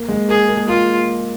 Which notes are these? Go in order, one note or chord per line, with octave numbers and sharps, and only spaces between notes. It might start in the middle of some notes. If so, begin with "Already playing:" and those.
Already playing: A#3
G#3
A#3 G#4
A#3
A#3 F4